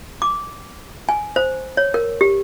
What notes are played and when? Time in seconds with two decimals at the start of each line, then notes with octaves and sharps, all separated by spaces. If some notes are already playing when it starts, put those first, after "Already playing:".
0.22 D6
1.09 G#5
1.36 C5
1.77 C#5
1.94 A#4
2.21 G4